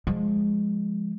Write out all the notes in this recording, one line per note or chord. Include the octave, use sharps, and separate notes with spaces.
F3 G#3